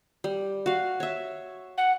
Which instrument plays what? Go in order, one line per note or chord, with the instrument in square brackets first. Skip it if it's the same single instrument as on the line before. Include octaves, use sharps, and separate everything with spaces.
[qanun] G3
F#4 F5
C#5 E5
[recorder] F#5